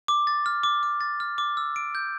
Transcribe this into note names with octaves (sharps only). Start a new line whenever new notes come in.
D6
A6
F6
D6
D6
A6
F6
D6
E6
D7
G6